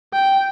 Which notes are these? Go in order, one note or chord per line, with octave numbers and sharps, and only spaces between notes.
G5